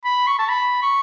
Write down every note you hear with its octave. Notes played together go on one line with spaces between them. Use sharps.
B5
C#6
A5
B5
C#6